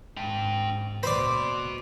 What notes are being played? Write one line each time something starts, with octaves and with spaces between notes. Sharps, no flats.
G#1 G#2 D4 G5
C#2 A#2 F#4 C5 D5 B5